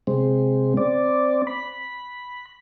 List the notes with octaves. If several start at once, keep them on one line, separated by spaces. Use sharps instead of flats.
C3 G#3 C4
C4 D5
B5